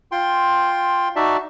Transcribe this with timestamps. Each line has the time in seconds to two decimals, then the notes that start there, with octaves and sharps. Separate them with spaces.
0.12 F4 G5 C6
1.16 D#4 F#4 D5 E5 A5